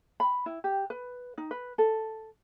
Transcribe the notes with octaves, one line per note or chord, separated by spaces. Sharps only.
B5
E4
G4
B4
D#4
B4
A4